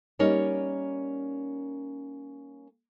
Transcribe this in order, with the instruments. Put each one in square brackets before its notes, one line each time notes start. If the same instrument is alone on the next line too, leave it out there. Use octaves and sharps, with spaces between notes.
[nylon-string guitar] G3 A#3 C#4 D#4 A#4 C#5